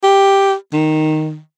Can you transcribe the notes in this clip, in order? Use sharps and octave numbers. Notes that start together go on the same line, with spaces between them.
G4
D#3